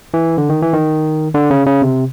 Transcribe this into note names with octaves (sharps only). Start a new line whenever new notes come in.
E3
D3
D#3
E3
D#3
D3
C#3
C#3
C3